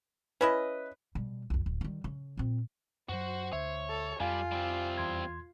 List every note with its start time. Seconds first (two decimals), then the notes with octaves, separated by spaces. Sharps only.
0.41 C#4 E4 B4 D#5
1.15 B2 G3
1.50 C2 F2
1.66 D1
1.81 D#3 G3
2.04 C#3
2.37 A#2 C4
3.09 F#2 F#3 F#4 C5
3.53 D2 C#5 E5
3.89 A4
4.20 F2 G3 F4 F5 G#5
4.52 G3 C4
4.98 E2 C6 G#6